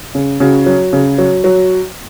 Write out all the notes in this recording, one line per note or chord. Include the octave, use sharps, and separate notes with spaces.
C#3
C#3 F#4
F#3
C#3
F#3
F#3